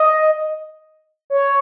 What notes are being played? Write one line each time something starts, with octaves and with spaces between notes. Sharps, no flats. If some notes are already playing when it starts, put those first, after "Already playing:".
Already playing: D#5
C#5